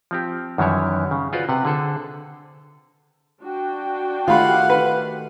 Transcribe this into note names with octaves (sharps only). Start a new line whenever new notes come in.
F3 C4 G4
F#2 D#3 E3 G3 E4 C#5
C#3
F4 F#4 G#4 B4 C5 D5
C3 B4 F#5
D3 G#4 A4 C5
D4 F#4 G5
D#3 A3 F4 G4 F5 F#5 B5
B4